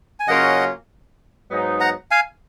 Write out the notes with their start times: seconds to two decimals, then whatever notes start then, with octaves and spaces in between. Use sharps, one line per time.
0.20 G#5
0.27 C#3 F#3 A#3 C#4 F4 D#5 F#5
1.50 G#2 F#3 B3 D#4
1.80 F#5 A#5
2.11 F5 G#5